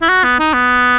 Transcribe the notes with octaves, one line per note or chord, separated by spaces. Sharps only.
E4
F#4
B3
D#4
B3